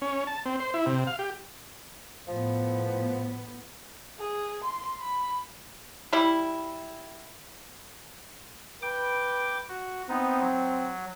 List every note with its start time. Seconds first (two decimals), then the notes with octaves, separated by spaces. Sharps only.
0.02 C#4
0.27 A5
0.46 C4
0.60 C5
0.74 E4
0.86 C3
1.07 F5
1.19 G4
2.28 A2 F3 B3
4.19 G#4
4.64 C6
5.00 B5
6.13 G3 E4
8.82 B4 G5 D6
9.69 F#4
10.09 B3 C4 D#4
10.41 F#3